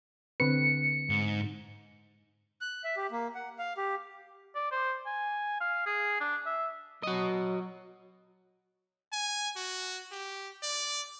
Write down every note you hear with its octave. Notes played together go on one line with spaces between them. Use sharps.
D3 C4 B4 C#7
G#2
F#6
E5
G4
A#3
F#5
F5
G4
D5
C5
G#5
F5
G#4
D4
E5
F#3 F#4 D#5
G#5
F#4
G4
D5